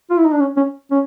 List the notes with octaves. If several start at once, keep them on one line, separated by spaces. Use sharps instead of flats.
F4
E4
D#4
D4
C#4
C#4
C#4